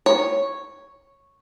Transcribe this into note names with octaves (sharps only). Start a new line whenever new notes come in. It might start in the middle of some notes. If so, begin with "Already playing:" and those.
C#5